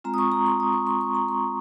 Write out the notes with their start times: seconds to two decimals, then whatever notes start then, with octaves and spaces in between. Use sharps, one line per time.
0.04 G#3 C4 F4 A#5
0.14 D#6
0.18 C#6
0.32 A#5
0.46 C6
0.60 D#6
0.73 C#6
0.87 C6
1.01 C#6
1.15 A#5
1.29 C6